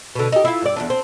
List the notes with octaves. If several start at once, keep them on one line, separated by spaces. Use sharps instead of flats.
B2 D3
D#4 G4
E4 F4
G2 D5
E2 G2 D4
C4